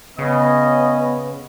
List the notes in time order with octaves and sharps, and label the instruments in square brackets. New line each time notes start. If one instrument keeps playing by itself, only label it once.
[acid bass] C#3 [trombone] B3 [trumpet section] C#4 D#5